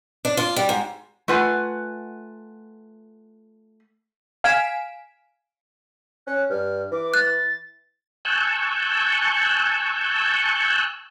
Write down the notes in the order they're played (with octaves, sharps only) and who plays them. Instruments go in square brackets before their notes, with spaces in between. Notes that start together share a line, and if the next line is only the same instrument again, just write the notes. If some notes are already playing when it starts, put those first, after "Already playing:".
[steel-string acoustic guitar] D4
F4
G3
G#2
[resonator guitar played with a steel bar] A3 F4 B4 F#5 G#5
[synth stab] F5 G#5 B6 D7 E7
[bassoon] C#4 [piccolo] F#6
[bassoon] G2 [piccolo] F6
[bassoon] E3 [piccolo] D6
[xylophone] F#6 [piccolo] A6
[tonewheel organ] G#5 A5 C#6 E6 F#6 G6